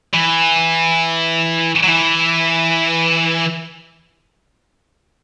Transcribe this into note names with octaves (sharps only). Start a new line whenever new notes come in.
E3
F#3
E3